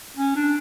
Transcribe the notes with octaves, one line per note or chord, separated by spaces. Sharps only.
C#4
D4